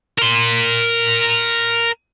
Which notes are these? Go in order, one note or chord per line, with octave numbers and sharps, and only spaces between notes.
A#4 C6